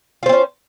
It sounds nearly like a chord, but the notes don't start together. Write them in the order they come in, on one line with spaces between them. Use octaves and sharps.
F4 C5 C4 C#4